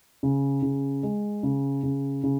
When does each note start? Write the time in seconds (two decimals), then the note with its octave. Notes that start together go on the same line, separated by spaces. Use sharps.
0.23 C#3
0.63 C#3
1.03 G#3
1.43 C#3
1.83 C#3
2.24 C#3